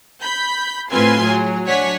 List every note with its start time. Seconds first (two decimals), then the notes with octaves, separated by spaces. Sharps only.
0.21 B5 G6
0.90 A2 C4 F4 B4 G#5 C6
1.24 F#3 G#4
1.67 F#3 D4 C#5 F#5 G#5 B6